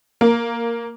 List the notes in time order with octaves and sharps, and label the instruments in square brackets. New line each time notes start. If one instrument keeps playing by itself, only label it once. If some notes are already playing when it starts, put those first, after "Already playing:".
[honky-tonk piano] A#3